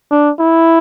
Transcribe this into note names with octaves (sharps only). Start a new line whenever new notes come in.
D4
E4